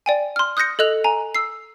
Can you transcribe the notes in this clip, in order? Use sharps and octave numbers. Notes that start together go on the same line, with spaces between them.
D5 G5 G#5
C6 F6
D#6 F#6 G6 A#6 C#7
A4 D#5 F#6 F7
G#5 A#5
E6 C7